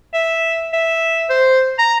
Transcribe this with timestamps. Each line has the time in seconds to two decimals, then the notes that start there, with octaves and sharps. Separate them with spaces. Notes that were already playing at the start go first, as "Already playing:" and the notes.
0.14 E5
0.73 E5
1.30 C5
1.79 A#5